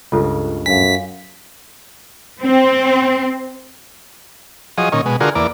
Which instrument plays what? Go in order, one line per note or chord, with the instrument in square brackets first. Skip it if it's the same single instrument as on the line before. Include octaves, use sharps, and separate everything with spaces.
[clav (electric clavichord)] C#2 G2 C#3 [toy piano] F4 A4
[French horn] F#2 [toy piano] F5 G#5 [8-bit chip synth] B6
[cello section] C4
[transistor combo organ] F3 F#3 G#4 D#5
A#2 D#3 C#4
B2 G#3
D3 F4 F#4 G#4 A#4
E2 A#3 D5